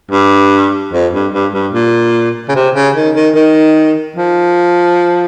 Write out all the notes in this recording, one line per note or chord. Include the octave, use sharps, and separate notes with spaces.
G2
F2
G2
G2
G2
A#2
C#3
C3
C#3
D#3
D#3
D#3
F3